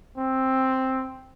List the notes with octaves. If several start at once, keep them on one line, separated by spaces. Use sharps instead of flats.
C4